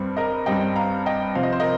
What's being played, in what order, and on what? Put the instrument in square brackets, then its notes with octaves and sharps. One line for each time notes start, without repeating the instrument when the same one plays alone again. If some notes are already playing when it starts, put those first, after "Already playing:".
Already playing: [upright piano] G2 G3 C4
A#4 D#5
G2 G3 C4 D#5 G5
F5 A#5
D#5 G5
C3 F3 C4 F5
D#5
C5
A#4 D#5